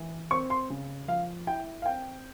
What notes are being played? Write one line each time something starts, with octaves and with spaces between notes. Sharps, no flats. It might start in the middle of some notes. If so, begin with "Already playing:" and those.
Already playing: E3
C4 C#6
C6
C#3
F3 F5
E4 G5
F5
C4 G5